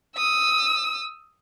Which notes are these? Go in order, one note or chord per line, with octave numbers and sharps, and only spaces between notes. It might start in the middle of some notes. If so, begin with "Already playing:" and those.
D#6 E6